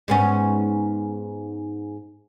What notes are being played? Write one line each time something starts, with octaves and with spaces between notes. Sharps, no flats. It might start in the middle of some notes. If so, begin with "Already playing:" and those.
G#2 B3 C#4